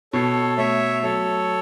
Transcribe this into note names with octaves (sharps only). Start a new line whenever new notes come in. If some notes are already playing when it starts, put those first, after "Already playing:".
B2 A4 C#5
A3 C#5 E5
F#3 A4 C#5